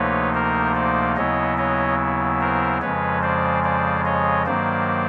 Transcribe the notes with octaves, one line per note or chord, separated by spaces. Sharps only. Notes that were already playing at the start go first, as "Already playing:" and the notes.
Already playing: D2 C3 F3 A#3 D#4 B4 C#5
A#4 C5
C5 D5
D#2 C#3 F#3 B3 E4 C#5 D#5
C#5 D#5
A#4 C5
F2 C#3 F3 G#3 B4 C#5
C5 D5
C5 D5
C#5 D#5
G2 D#3 F#3 A#3 C5 D5